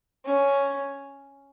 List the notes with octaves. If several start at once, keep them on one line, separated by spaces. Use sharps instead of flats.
C#4